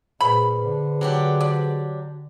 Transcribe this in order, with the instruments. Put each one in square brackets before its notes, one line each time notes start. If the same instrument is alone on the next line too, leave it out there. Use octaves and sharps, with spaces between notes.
[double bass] A#2 [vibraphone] G#4 B4 C5 [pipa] B5
[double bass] D3
[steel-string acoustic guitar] F#3 D4 G4
[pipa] D5